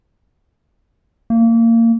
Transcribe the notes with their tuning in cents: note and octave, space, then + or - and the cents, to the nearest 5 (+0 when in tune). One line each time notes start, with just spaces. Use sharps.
A#3 -25